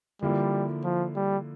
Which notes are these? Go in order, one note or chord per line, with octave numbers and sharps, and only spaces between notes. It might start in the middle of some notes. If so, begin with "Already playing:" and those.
D3 F3 G3 A#3 E4
F3
G3